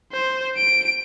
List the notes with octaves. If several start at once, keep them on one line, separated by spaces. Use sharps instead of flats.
C5
D7